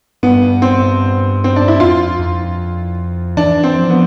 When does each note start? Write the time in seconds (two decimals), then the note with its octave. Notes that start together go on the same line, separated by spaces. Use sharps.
0.23 G2 B3
0.62 C4
1.44 C4
1.56 D4
1.68 E4
1.80 F2 F4
2.19 F2
3.37 E3 D4
3.64 C4
3.77 F3
3.90 B3